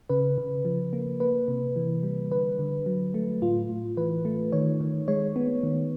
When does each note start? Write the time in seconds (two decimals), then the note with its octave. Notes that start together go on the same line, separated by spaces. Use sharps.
0.09 C#3 B4
0.38 C#3
0.65 F3
0.93 A#3
1.20 A#3 B4
1.48 C3
1.76 E3
2.03 G3
2.31 D3 B4
2.59 D3
2.86 F#3
3.14 A3
3.42 A2 F4
3.69 A2
3.97 E3 B4
4.25 A3
4.52 D#3 C#5
4.81 D#3
5.08 G#3 C#5
5.36 B3
5.63 D#3